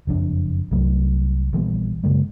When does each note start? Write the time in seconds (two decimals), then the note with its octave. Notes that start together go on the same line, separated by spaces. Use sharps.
0.07 F#1 F2 D4
0.71 C2 F#3 A3
1.53 A#1 E3 G3 B3
2.04 F#2 C#3 G#3 A#3